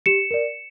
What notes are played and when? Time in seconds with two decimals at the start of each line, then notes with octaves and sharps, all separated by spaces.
0.06 G4 C#7 E7
0.31 A#4 D5